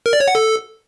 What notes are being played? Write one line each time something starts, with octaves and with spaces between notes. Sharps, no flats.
A#4
D5
C#5
F#5
A4